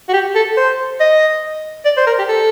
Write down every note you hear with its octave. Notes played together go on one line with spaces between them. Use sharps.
F#4
G4
A4
C5
D#5
D5
C5
A#4
G4
A4